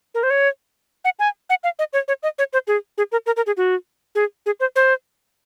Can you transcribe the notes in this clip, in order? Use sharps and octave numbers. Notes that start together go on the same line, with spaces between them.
A#4
C5
C#5
F#5
G#5
F#5
F5
D#5
C#5
C#5
D#5
C#5
C5
G#4
G#4
A#4
A#4
A#4
G#4
F#4
G#4
G#4
C5
C5